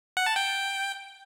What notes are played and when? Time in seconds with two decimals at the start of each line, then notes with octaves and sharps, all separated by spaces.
0.17 F#5
0.26 A5
0.36 G5